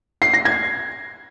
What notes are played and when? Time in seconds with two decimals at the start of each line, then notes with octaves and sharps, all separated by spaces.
0.22 C7
0.34 A#6
0.45 G#6